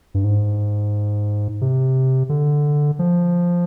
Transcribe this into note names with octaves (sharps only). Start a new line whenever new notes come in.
G2
G#2
C3
D3
F3